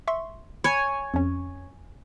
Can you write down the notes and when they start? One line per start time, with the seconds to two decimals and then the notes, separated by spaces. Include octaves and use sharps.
0.08 E5 C6 C#6
0.64 C#5 G#5 B5
1.14 F2 C#4